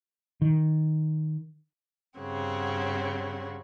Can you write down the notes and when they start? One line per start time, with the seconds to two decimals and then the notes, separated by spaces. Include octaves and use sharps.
0.42 D#3
2.19 G2 C#3 C4 F#4